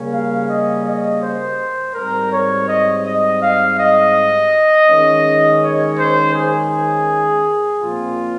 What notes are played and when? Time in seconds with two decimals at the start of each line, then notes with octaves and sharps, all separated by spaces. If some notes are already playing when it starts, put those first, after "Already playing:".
Already playing: C#3 G3 A#3 C#4
0.12 F5
0.49 D#5
0.85 D#5
1.21 C5
1.95 G#2 G3 C4 A#4
2.32 C#5
2.69 D#5
3.05 D#5
3.41 F5
3.78 D#5
4.88 D#3 G#3 C#4
5.62 C#5
5.98 C5
6.35 G#4
7.82 A#2 F3 C4 F4